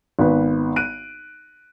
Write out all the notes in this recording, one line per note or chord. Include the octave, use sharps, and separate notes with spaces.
G#1 B3 B4
F#6 D7 D#7